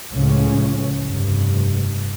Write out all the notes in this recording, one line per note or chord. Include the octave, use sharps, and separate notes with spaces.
C#2 A2 C#3 F3 C#4
F1 G2